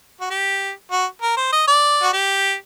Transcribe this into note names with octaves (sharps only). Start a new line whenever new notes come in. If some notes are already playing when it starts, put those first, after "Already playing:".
F#4
G4
F#4
A#4
C5
D#5
D5
F#4
G4